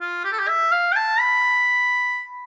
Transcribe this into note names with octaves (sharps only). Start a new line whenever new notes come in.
F4
G4
A4
G4
E5
F5
G5
A5
B5